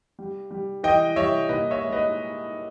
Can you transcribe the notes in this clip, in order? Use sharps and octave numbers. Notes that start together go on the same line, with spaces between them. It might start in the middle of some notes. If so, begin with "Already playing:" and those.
G3
G3
E3 D#5 G5
G3 C#5 E5
A#2 B4 D#5
C#5 E5
G#3
B4 D#5